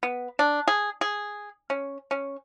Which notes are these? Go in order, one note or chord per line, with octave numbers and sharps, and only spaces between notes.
B3
D4
G#4
G#4
C#4
C#4